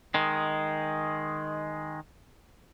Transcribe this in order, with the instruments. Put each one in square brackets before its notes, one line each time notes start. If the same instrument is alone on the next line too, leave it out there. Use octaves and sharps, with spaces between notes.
[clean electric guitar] D#3 G#3